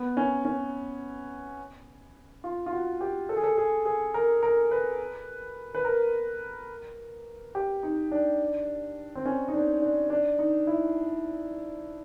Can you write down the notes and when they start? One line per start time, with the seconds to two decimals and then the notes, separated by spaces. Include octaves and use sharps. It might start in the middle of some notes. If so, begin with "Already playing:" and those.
Already playing: B3
0.17 C#4
0.45 C#4
2.44 F4
2.66 F4
2.73 F#4
3.01 G4
3.29 A4
3.36 G#4
3.44 A4
3.57 G#4
3.85 G#4
4.14 A#4
4.43 A#4
4.71 B4
5.75 B4
5.85 A#4
7.55 G4
7.83 D#4
8.12 D4
9.15 C4
9.26 C#4
9.48 D#4
9.54 D4
9.82 D4
10.10 D4
10.39 D#4
10.67 E4